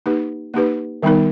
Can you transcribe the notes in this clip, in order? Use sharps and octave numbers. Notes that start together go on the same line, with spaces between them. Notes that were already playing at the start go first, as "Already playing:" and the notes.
A#3 D#4 G4 B4
A#3 D#4 G4 B4
D#3 G3 B3 D#4 A#4